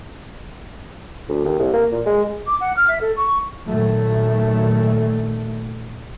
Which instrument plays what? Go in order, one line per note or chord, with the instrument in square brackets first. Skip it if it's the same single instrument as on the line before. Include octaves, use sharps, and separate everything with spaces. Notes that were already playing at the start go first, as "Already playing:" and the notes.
[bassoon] D2
D#2
C2
A#3
A#2
G#3
[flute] D6
F#5
F6
E5
A4
C#6
[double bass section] A#2 D#3 F#3 A3